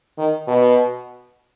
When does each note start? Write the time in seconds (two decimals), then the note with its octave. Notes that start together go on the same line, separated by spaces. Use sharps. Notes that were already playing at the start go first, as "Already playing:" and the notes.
0.18 D#3
0.48 B2